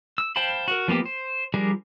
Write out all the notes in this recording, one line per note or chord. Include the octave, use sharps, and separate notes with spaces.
E6
C5 F5 G5 A5 B5
F#4 A#4
F3 A#3 B3 G4
C5
F3 G3 D4 G#4 A#4